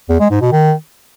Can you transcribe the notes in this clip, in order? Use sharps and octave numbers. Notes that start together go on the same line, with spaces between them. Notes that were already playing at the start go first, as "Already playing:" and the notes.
E2
G#3
G#2
B2
D#3